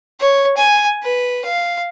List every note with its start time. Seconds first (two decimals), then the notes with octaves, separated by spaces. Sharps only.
0.20 C#5
0.57 G#5
1.03 B4
1.45 F5